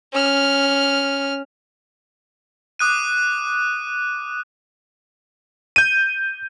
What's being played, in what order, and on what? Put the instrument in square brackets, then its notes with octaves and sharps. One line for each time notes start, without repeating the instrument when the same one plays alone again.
[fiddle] C#4 F6
[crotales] D6 D#6 F#6 D#7
[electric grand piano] G6 D#7